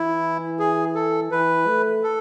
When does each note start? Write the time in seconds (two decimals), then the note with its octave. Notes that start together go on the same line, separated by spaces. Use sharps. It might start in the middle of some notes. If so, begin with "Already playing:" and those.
Already playing: E3 E4
0.59 G#4
0.95 A4
1.31 E3 B4
1.67 A3
2.03 A4